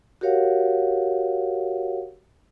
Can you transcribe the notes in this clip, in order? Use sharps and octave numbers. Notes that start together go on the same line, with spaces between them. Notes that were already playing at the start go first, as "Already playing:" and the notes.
F#4 G4 A#4 C#5 F5 F#5